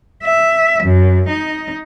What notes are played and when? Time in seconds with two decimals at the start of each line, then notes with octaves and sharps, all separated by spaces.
0.24 E5
0.83 F#2
1.29 D#4